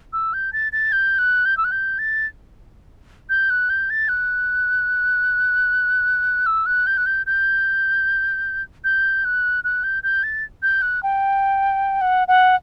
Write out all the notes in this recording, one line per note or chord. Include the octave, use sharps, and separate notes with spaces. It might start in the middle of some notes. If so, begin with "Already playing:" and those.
E6
G6
A6
A6
G6
F#6
G6
E6
F#6
G6
A6
G6
F#6
G6
A6
F#6
E6
F#6
G6
F#6
G6
G6
G6
F#6
F#6
G6
G6
A6
G6
F#6
G5
F#5
F#5